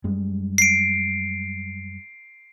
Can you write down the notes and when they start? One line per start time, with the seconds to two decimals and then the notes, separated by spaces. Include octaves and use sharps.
0.04 F#2 G3 G#3
0.58 C7 D7